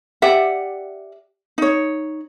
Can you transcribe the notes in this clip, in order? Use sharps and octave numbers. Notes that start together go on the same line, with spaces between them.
G4 D5 E5 F#5
D#4 C#5